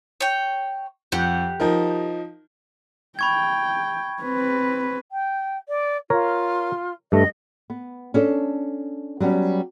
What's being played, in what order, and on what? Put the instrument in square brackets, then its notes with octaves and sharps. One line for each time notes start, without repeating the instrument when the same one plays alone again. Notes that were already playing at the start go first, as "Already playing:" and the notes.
[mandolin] C#5 G5
[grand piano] F2 [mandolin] G4 F#5
[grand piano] F3 D#4 A#4
[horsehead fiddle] G5 [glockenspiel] B5 C#6 G#6
[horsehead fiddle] C4 B4
[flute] G5
D5
[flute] F4 [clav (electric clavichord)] A#4 C#5
[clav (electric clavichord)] G2 A3 [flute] D#5
[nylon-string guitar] B3
C#4 D4 A4
F#3 G3 B3 C#4